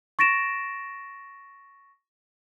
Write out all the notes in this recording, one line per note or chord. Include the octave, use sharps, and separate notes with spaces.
C#6 A6 A#6 D7 E7